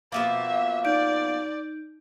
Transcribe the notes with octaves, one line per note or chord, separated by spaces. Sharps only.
B2 F3 A#3 E5
D#4 D5 G6 D7